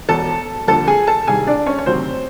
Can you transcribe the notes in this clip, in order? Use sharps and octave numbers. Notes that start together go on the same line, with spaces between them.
E1 E2 B2 A4 A5
F2 D3 G3 A#3 A4 A5
G#4 G#5
A4 A5
C2 C3 D#3 G3 G#4 G#5
D4 D5
C#4 C#5
C#5
D2 C3 D#3 F#3 C4 C5